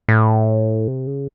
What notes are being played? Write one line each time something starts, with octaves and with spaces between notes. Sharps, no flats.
A2
C3
C#3